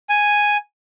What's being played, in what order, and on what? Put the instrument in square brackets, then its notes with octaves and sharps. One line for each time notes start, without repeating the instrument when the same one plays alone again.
[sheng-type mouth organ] G#5